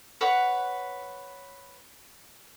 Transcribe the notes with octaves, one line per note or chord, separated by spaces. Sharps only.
B4 C#5 F#5